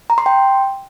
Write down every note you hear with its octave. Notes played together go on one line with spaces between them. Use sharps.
A#5
C6
G5